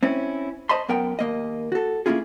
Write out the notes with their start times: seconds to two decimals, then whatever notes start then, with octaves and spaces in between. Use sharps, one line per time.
0.03 C4 C#4 E4
0.69 C5 D#5 A5 B5 C6
0.89 F#2 B3 A#4 F#5 G5
1.19 D#2 A#3 D#5
1.72 F#4 A4
2.06 A#3 B3 C#4 E4 F4 G#4